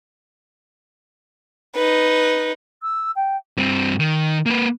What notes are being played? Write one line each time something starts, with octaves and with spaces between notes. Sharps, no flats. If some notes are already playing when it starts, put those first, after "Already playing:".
D#4 B4
E6
G5
G2 C4
D#3
A#3 B4